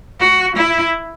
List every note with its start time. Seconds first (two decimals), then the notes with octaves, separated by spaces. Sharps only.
0.20 F#4
0.56 E4